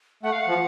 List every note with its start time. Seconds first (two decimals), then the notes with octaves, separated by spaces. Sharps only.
0.23 A3 F#5
0.32 F5
0.41 F#5
0.47 F3